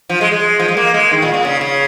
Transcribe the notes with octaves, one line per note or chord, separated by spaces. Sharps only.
F3
G#3
G#3
F3
G#3
A#3
G#3
D#3
A#2
A#2
C#3
C#3